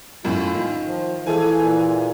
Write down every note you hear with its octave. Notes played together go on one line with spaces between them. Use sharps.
F#2 A2 F4
D#3
F3
E3 F4 G#4 A4 G#5
A#2